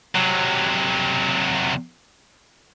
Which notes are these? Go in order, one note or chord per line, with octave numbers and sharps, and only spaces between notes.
C3 F#3